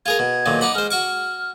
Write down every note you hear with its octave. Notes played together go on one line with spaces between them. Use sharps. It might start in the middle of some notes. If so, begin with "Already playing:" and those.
F4 G#4 A#4 G#6
B2
B1 A#2 D#3
D#4 F#5 B5 D6
G#3 C5 F6
F#4 C#6 D6 F6